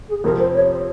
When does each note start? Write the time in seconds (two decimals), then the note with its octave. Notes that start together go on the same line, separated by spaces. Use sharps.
0.08 G#4
0.23 F2 C3 F3 C4 A#4
0.39 C5
0.54 C#5
0.70 C5